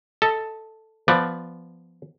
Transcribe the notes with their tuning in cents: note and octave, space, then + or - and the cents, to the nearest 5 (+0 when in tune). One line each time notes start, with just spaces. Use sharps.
A4 +0 D#5 +35
F3 -10 B3 +0 D5 +10